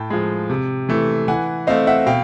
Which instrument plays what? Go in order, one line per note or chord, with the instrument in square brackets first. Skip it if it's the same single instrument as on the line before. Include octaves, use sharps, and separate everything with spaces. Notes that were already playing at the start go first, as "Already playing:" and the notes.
Already playing: [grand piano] A2 G5 A5
F3 G#3
C3
E3 A3
E3 F#5 G#5
A3 C4 D#5 F5
E5 F#5
B2 F5 G5